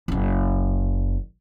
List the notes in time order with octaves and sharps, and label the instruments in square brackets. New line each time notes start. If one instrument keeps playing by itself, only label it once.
[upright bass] F#1 C#3